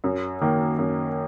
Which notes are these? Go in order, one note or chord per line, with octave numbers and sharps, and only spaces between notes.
F#2
D#3 A#3
F#2